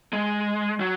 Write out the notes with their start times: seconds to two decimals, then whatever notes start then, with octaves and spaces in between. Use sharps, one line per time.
0.13 G#3
0.80 F#3